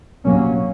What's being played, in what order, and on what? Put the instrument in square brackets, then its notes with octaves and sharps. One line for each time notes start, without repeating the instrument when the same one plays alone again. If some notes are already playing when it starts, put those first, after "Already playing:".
[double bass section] C3 F#3 A#3 C#4